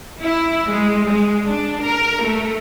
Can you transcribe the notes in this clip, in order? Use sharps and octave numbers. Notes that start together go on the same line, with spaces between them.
E4
G#3
G#3
D4
A#4
A3